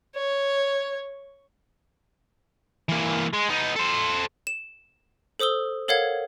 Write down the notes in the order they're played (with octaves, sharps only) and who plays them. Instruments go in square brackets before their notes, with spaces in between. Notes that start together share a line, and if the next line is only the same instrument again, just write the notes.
[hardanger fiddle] C#5
[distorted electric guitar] E3 A#3
G#3
B3 D#4
A4 C5
[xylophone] E7
A4 C5 D#6 E6 G7
A4 A#4 C#5 F5 F#5 G#6